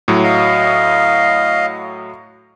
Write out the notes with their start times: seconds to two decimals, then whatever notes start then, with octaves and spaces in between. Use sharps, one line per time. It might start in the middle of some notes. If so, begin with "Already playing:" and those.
0.08 A2 F#3
0.24 D#5 F5